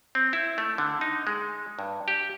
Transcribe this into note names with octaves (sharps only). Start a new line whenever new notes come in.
C4
E4
A3
D3
D#4
G#3
G2
G4